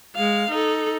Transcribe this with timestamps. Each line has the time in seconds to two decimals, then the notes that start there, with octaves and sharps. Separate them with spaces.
0.15 G#3 F5
0.50 D#4 A4